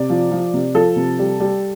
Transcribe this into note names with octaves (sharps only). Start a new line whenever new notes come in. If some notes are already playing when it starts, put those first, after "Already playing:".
Already playing: C3 D5
F3
F3
C3
F3 A4
C3
G3
G3